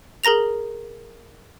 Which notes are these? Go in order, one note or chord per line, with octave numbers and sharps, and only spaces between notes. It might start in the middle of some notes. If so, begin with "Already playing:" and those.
G#4 A#4 A#5 A#6 F7